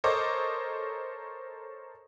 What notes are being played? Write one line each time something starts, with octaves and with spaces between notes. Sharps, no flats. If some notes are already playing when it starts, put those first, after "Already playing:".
A4 A#4 C5 C#5 D#5 D6